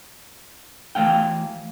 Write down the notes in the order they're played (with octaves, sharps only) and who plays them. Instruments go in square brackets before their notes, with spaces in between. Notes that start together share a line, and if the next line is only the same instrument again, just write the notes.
[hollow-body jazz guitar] E3 A3 F5 G5